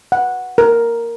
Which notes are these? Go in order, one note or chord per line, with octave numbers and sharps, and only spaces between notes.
F#5
A#4